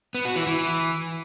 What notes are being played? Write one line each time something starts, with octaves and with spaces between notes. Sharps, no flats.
B3
F#4
E3
E3